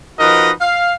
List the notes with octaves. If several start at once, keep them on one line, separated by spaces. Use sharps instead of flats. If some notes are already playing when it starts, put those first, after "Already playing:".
F3 D#4 F#4 A#4 B4 D#5
F5